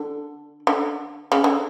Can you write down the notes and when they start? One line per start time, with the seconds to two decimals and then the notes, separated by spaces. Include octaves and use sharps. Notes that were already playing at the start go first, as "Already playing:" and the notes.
Already playing: D3
0.67 D3
1.32 C#3
1.44 D3